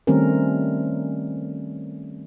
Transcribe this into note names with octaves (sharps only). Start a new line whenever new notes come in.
D#3 G3 A3 C4 C#4 A#4